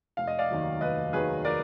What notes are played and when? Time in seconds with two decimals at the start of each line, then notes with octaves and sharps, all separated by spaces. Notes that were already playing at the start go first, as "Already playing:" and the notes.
0.17 F1 F5
0.27 D#5
0.38 D5 F5
0.50 D#2 D#3 F#3
0.81 F1 B4 D#5
1.13 D#2 D#3 F#3 G#4 B4
1.45 A#4 D5